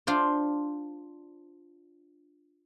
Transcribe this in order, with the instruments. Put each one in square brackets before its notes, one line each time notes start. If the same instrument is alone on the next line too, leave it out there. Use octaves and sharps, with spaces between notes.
[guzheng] D4 F4 C5